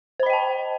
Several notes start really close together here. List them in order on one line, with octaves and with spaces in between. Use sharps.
C5 B5 D#5 G5 A5